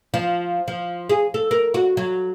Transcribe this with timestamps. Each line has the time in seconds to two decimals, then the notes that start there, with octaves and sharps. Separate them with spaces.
0.14 F3
0.68 F3
1.09 G#4
1.34 A4
1.51 A#4
1.74 F#4
1.97 F#3